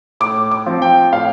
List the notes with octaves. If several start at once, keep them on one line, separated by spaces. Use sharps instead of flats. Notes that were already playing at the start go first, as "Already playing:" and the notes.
A2 D6
D6
F3 C4
G5
A2 F5